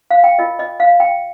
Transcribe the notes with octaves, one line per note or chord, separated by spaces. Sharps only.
F5
G5
F4 A#4 D#5
D#5
F5
G5